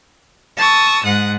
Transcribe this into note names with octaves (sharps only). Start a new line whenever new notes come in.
A5 C#6 D#6 E6
G#2 F#5 D#6